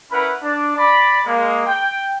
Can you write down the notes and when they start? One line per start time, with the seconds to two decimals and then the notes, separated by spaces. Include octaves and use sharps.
0.12 C#4 E4 A#4 B4 F#5 B5
0.43 D4
0.77 D5 B5
1.26 G#3 A#3
1.66 G5